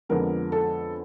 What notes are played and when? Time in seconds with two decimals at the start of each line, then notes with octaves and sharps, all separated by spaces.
0.09 F2 D3 F3 G#3 B3 A#4
0.52 A4